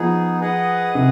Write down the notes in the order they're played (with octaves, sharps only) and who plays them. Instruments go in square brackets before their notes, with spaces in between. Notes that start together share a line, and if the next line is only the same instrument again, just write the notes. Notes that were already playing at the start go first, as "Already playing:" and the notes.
Already playing: [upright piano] F3 [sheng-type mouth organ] B3 D#4 G#4
[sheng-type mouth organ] G#4 B4 D#5 F#5
[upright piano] C3